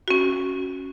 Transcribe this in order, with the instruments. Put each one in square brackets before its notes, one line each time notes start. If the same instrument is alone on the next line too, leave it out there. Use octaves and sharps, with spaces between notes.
[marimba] C#4 F#4